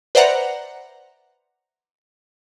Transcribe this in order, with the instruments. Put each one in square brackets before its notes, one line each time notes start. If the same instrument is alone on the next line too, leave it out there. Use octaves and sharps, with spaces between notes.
[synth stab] B4 C5 D5 E5 F#5 A#5